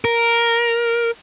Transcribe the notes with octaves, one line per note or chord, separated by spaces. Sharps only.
A#4